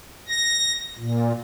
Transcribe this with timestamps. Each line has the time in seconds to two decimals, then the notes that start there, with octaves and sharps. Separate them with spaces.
0.28 A#6
0.99 A#2